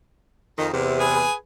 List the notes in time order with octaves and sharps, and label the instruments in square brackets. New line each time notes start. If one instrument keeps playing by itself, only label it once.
[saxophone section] F2 D#3
E2 C3
[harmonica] G#4 B4 G#5